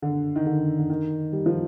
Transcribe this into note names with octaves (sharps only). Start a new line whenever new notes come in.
D3
D#3
D3
D3
D#3
G3
F3